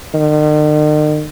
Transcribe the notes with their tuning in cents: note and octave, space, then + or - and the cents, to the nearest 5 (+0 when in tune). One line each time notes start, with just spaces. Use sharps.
D#3 -45